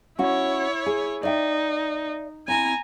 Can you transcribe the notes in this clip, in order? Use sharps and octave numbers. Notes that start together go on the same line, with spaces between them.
C#4 E4 F#4 C#5
G#4
D#4 D5 E5 G5
C4 E4 G#5 A#5